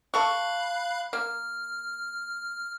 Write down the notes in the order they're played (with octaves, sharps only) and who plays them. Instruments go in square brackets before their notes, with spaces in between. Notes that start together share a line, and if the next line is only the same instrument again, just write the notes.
[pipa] A4 C#6 [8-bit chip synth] F5 B5 F#6
[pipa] A#3 [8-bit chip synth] F6